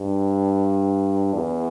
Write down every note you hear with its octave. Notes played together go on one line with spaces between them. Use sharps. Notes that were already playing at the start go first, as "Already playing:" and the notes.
Already playing: G2
E2